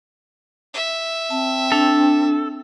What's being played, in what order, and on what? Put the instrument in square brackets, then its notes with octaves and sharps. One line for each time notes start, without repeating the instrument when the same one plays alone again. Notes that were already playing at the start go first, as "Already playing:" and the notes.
[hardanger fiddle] E5
[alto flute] C4 [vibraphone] A5
[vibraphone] D4 [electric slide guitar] A4